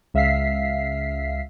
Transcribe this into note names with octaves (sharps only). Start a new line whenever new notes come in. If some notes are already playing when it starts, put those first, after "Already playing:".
C#2 E5 F5 B6 C7